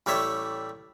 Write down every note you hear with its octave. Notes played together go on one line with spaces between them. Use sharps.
A1 G3 A3 C#5 E5